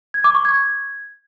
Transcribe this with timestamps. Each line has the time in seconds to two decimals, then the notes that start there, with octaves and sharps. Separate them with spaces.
0.14 G#6
0.24 D6
0.35 C#6
0.45 G#6